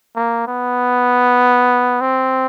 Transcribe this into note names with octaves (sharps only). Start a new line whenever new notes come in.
A#3
B3
C4